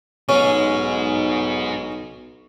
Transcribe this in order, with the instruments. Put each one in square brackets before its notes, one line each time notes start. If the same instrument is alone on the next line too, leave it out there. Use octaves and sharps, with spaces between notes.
[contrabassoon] B1 [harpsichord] C#4 [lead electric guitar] D#4 G#4